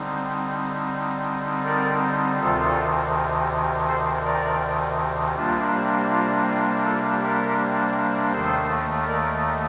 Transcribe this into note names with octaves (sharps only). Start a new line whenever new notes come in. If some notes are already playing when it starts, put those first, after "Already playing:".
Already playing: D3 G3 C4 D#4
A#4 D5
D2 C3 D#3 F4 A4
A4 C5
A#4 D5
C3 G3 A#3 D4 F4
F4
F4
F4 A4
G4 A#4
D#2 D#3 A3 A4 C5
A#4 D5